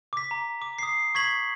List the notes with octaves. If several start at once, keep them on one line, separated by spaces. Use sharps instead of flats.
D6 B6
A#5
D6
D#6 C7
C#6 G#6 B6 F#7